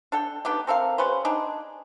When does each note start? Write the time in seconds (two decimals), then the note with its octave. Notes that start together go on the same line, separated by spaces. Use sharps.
0.12 D4 A4 G5
0.45 B3 D4 D#4 G4
0.67 C4 A4 A#4 F5
0.98 G3 C#4 B4 C5
1.25 D4 D#4 G#4